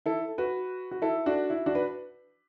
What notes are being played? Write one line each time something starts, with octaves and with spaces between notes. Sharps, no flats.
E4 A4
F#4 B4
F#4
E4 A4
D4 F#4
E4
D4 F#4
B4